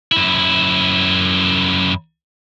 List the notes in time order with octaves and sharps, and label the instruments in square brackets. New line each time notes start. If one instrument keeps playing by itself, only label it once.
[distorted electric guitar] F#2 E4